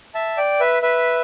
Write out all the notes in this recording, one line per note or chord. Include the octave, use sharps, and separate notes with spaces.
E5 A5
D5 G5
B4 E5
B4 E5